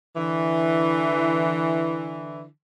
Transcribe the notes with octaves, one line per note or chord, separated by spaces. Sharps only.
D3 E3